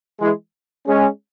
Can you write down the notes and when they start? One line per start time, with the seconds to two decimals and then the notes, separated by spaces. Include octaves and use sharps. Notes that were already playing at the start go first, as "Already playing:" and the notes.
0.20 E3 G#3
0.87 G#3 C#4